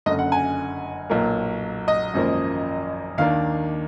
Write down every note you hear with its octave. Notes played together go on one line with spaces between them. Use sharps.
F#1 F#2 D3 D#5
F#5
G#5
B1 A#2 F#3 A#3
D#5
G#1 F#2 F3 A#3
D#2 D#3 A#3 D4 F5